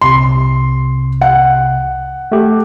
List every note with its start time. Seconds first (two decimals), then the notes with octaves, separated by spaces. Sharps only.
0.02 C2 C3 C6
1.21 F#5
2.32 A3 G4